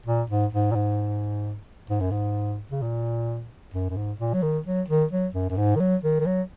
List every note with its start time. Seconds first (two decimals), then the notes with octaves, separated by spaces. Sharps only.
0.06 A#2
0.30 G#2
0.52 G#2
0.72 A#2
0.75 G#2
1.90 G#2
2.00 F#2
2.11 G#2
2.71 C#3
2.82 A#2
3.74 F#2
3.90 F#2
3.96 G#2
4.19 A#2
4.34 F#3
4.42 D#3
4.66 F#3
4.88 D#3
5.11 F#3
5.34 F#2
5.50 F#2
5.57 G#2
5.76 D#3
5.80 F#3
6.03 D#3
6.20 D#3
6.26 F#3